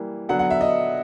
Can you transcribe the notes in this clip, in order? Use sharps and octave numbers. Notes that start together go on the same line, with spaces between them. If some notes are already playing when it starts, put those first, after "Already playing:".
Already playing: E3 G3 A#3
D3 F#3 B3 D4 F#5
F#5
E5
D#5